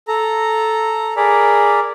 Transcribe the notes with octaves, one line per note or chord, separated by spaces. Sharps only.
A4 A#5
G#4 A#4 D5 B5